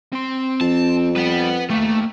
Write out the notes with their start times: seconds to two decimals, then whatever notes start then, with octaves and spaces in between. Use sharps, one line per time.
0.13 C4 C6
0.61 F2 A5
1.16 G3 B4 F#5
1.70 A3 A#3 G4